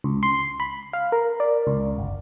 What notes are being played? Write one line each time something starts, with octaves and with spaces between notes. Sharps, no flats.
C#2
C6
B5
F5
A#4
D5
C#2
G1